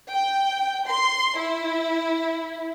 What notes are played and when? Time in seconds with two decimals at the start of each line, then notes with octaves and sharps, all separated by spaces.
0.12 G5
0.87 C6
1.38 E4